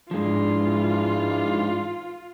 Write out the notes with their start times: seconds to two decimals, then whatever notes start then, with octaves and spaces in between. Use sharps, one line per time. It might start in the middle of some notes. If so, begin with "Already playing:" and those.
0.11 G#2 E3 F3 G#3 D4 F4